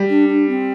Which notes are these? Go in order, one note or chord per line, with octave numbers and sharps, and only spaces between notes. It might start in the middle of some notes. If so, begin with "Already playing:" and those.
Already playing: G3
D4
D4
C4